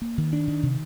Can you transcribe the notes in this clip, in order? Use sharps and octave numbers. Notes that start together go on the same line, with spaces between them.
A#3
D#3
D4
D#3
C3